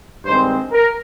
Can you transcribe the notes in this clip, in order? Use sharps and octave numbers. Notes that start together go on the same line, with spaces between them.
G2 D#3 G#3 C4 C5
A#4